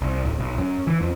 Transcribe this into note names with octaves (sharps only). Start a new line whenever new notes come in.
C2
D1
B1
F#2
E3
F2